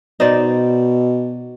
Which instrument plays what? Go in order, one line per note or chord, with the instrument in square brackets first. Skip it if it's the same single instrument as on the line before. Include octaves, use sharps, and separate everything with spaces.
[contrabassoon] B2 [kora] D#4 C5 D5